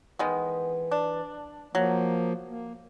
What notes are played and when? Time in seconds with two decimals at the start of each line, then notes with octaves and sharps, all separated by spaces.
0.19 D#3 E3 G#3 B3
0.91 D4
1.75 F3 F#3 A#3
2.49 A#3